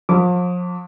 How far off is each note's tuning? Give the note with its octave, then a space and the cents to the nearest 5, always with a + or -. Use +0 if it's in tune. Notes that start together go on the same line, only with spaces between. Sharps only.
F3 +40 D6 -25